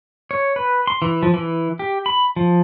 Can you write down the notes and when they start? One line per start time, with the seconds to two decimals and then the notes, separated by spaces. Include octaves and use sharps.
0.31 C#5
0.56 B4
0.87 C6
1.02 E3
1.23 F3
1.34 E3
1.79 G4
2.06 B5
2.36 F3